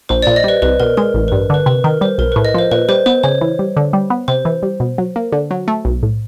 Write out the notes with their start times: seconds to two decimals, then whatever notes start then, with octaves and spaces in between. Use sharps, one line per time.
0.09 A#1 C5
0.22 D5
0.27 A#2
0.36 D#5
0.44 G3 B4
0.62 C2 B4
0.80 B2 A#4
0.97 G#3 A#4
1.14 A1
1.28 B4
1.32 G2
1.50 D3 B4
1.66 C3 B4
1.84 D#3 A#4
2.01 G3 C5
2.18 B1 A#4
2.32 B4
2.36 A2
2.45 D#5
2.54 F3 C5
2.71 A#2 B4
2.89 G3 C5
3.06 B3 C5
3.23 C#3 C#5
3.41 E3
3.59 G3
3.77 D3
3.93 G3
4.10 B3
4.28 C3 C5
4.45 E3
4.63 G3
4.80 B2
4.98 F#3
5.16 A#3
5.32 D3
5.51 F#3
5.68 A3
5.85 B1
6.03 A2